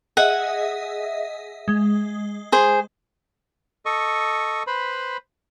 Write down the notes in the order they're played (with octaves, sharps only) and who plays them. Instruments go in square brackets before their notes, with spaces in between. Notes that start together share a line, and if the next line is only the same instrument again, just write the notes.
[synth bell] G#4 D#5 E5 [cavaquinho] F#5
[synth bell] G#3
[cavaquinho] G#4 C5
[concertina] A4 D#5 C#6
B4 C5 B5